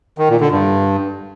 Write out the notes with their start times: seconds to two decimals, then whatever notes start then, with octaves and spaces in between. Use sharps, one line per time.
0.18 D#3
0.29 A#2
0.40 D3
0.52 G2